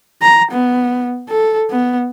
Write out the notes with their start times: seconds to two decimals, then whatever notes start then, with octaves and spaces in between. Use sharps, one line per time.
0.22 A#5
0.52 B3
1.29 A4
1.71 B3